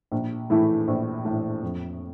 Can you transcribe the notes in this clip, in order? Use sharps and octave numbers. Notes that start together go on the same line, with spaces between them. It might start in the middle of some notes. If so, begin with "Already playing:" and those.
A#1
A2 E3 A3 E4
A#1
A2 E3 A3 E4
F2